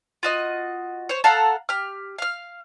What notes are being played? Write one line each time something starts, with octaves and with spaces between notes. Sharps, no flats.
F4 F#4 D#5
C5 C#5
A4 F5 F#5 A#5
G4 F6
F5 F6